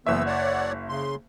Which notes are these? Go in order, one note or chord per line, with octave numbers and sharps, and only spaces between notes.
F#1 E3 B3 E5 E6
C#5 D5 F#5
C#3 C6